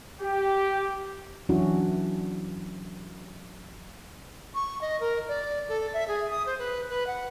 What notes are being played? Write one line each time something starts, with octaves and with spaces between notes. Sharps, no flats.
G4
E3 F#3 C#4 D4 E4 F#4
C#6
D#5
A#4
D5
A4
E5
G#4
D#6
C5
B4
B4
F#5